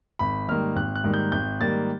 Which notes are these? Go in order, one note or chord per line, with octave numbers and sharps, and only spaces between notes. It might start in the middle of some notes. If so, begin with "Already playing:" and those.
G#1 B5
G#2 D#3 G3 A#3 F6
G#1 F#6
F#6
G#2 D#3 G3 A#3
G6
G#1 G6
G#2 D#3 G3 A#3 A6